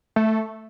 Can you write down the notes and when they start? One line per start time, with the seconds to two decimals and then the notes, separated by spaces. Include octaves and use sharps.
0.16 A3